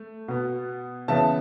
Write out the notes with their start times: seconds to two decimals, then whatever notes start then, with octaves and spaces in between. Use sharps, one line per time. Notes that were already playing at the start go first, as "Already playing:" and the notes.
Already playing: A3
0.28 B2 B3
1.08 C#3 E3 B3 E5 A5